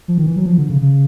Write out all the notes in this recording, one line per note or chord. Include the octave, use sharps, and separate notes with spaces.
F3
D#3
E3
F#3
F3
D3
C#3
C#3